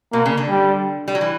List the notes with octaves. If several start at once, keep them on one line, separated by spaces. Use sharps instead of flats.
B2 A#3
C#3
D3
G3
G3
F#3
E3